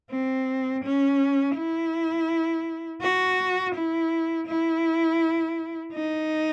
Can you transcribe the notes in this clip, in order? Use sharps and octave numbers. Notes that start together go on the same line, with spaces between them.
C4
C#4
E4
F#4
E4
E4
D#4